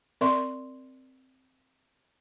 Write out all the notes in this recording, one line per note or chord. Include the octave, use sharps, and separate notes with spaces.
C4 A#4 D5 E5 C6 C#6